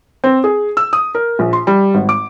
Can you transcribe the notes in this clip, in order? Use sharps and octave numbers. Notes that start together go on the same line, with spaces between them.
C4
G#4
E6
D#6
A#4
A#1
C6
G3
G#1
D6